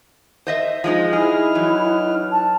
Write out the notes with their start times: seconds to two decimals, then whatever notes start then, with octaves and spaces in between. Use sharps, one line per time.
0.47 C5 D#5 E5
0.84 F3 G#3 D#4 C5
1.13 D#4 E4 G#4 F6
1.55 E3 F#3
2.32 A5